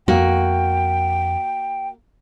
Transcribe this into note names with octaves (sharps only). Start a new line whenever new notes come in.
F2 A#3 F#4 G5